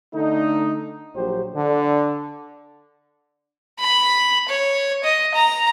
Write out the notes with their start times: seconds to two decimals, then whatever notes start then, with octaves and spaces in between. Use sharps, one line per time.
0.14 D3 A3 D#4
1.15 A#1 F#3 G4 C5
1.55 D3
3.80 B5
4.49 C#5
5.04 D#5
5.34 A#5